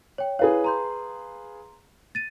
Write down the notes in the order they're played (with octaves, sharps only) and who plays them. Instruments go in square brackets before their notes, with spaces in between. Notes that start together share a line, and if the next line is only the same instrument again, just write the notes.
[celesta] C#5 G5
[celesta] E4 C#5 [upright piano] G#4 B4 F5
[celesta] A#5 C6 G6
A6 D#7